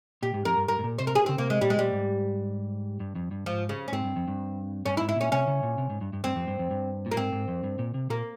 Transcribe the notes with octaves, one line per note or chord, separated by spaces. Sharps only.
A#2 G4
G#2
F2 A#4
G2
G2 A#4
G#2
A#2
C3 C5
A#4
G#4
C#3 C4
C3 A#3
G#3
A#2 G3
G#3
A#2 G3
G#2
G2
F2
G2
G#2 F3
C#3
C#4
G#2 C4
G2
F2
G2
G2 C#4
E4
G#2
E4
A#2 C#4
C3 C#4
C#3
A#2
C3
G#2
G2
G2
G2 C4
F2
G2
F2
G2
A#2
A#3
G#2 C4
G#2
F2
G2
A#2
C3
A#2 A#3